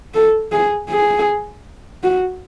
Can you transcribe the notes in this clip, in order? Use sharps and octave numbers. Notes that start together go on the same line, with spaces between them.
A4
G#4
G#4
F#4